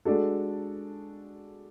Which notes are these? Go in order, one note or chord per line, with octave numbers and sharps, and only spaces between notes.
G#3 D4 F#4 A4